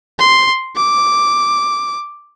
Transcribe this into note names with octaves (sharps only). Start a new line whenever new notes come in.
C6
D6